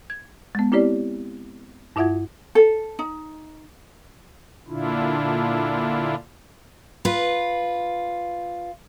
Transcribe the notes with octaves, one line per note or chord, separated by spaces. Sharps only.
G#6
G#3 B3
C4 E4 G4 C#5 D5
G2 E4 F4 E5 F#5 G#6
A4
D#4
A#2 D3 D4 E4 F4
F4 B4